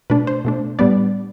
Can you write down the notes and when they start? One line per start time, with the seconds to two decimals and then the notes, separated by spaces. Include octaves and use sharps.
0.10 B2 A3 D4 B4
0.27 C5
0.45 B2 A3 D4
0.79 A2 G3 B3 D4 D5